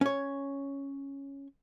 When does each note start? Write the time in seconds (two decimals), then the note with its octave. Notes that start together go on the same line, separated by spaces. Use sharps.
0.01 C#4 C#5